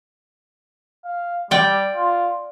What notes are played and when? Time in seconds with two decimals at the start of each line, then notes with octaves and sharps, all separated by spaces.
1.05 F5
1.51 G3 D5 G5
1.94 F4